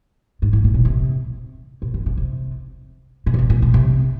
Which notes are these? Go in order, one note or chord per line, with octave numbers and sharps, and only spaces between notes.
G#2
A2
A#2
B2
C3
B2
C3
C#3
C3
B2
A#2
B2
A#2
B2
C3